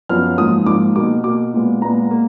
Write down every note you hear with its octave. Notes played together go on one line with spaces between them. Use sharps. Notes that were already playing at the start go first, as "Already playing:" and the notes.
F#2 F3 B3 F6
G#2 F3 A#3 D#6
G#2 F3 A#3 D6
B2 A#3 D6
B2 A#3 D6
A#2 G#3 B3
A#2 G#3 B3 A#5
A#3